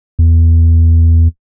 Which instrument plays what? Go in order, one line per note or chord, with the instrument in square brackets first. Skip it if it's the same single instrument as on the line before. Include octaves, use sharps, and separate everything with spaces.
[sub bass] E2